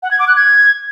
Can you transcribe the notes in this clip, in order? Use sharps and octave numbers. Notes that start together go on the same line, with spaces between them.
F#5
G#6
D6
F#6
G#6